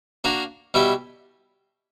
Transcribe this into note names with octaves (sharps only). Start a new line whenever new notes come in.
A#3 D4 F#4 A#4
B2 G3 B3 E4 G4